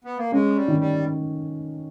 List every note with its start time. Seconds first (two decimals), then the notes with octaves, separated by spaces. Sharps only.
0.04 B3
0.18 A#3
0.32 G#3 C#4
0.56 G3
0.68 D#3
0.80 G3